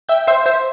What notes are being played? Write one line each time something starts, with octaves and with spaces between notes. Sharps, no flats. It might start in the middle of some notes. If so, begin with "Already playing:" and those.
E5 G5
C5 E5
C5 E5